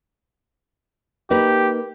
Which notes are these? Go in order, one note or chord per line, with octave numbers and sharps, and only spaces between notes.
A#3 D#4 G4 B4